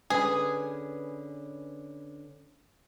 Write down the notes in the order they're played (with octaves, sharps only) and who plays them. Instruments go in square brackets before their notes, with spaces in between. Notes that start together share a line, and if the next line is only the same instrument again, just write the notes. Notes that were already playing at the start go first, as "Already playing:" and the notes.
[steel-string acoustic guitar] D3 C#4 B4 [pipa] G#4